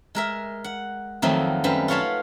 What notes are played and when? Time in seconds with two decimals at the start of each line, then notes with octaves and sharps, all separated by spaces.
0.15 G#3 A#4 E5
0.64 F#5
1.22 F2 D#3 F#3 A3 C4 D#4
1.64 F#2 G3 C4 B4
1.88 F4 F#4 C#5 F5 A5 B5